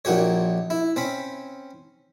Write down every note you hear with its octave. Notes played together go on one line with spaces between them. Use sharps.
A#1 A#2 F#4 G4 C#5
E4
C4 C#4 B5